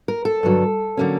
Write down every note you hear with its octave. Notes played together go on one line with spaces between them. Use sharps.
A#4
A4
G2 D3 F#3
D3 F#3 A#3 C#4